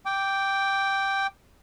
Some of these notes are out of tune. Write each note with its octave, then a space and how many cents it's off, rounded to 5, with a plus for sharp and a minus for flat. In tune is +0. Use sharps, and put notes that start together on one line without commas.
G5 +0 D6 -10